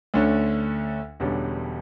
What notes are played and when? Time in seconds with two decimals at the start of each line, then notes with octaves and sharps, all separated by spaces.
0.14 D2 D3 A3 C#4
1.20 E1 E2 D3 G3 C#4